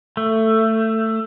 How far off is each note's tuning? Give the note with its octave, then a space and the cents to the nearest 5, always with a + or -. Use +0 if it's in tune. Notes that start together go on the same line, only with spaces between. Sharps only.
A3 +15